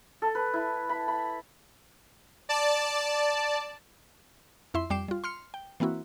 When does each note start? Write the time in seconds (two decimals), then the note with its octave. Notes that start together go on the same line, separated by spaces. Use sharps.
0.22 A4
0.35 B4
0.54 E4
0.89 B5
1.08 B5
2.49 D5 A5
4.74 F2 E4 E5 C6
4.90 F2 G3 G5 D6 C7 E7
5.08 G3 F4
5.24 C6 F6 C#7
5.54 G5
5.80 E3 A#3 C4 E4 F#4